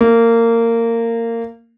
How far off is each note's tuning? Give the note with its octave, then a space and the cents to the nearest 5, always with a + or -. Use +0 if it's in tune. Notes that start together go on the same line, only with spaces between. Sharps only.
A#3 -20